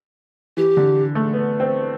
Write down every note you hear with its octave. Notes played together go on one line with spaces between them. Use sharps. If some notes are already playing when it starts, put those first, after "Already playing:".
E3 G4
D3
A3
B3
C4